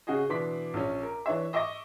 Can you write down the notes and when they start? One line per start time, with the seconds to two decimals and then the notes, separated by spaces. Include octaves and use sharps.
0.07 C#3 F#4 G#4 D#5
0.29 B2 E3 D4 C6 D6 B6
0.74 A#1 C#4
1.03 A#4
1.26 E3 D4 C#5 E5
1.53 D#5 E5 C#6 D6 A#6